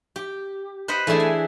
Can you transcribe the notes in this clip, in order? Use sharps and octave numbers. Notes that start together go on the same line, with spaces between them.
G4
B4 C5 D#5 F#5 B5
E3 A3 D4 E4 G#4
G#5